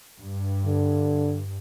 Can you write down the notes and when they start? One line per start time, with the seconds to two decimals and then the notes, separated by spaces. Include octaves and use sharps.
0.19 G2
0.66 D3